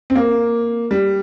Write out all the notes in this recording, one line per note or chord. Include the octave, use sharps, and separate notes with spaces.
C4
A#3
G3